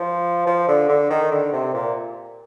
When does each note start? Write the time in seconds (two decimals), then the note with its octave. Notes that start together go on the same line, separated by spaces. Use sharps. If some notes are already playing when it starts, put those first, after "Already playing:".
Already playing: F3
0.47 F3
0.68 D3
0.89 D3
1.10 D#3
1.31 D3
1.53 C3
1.74 A#2